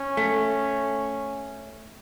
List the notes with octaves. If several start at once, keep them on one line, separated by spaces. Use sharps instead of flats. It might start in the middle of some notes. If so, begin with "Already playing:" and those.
Already playing: C#4
A3